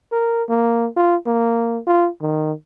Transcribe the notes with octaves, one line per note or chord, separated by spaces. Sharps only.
A#4
A#3
F4
A#3
F4
D#3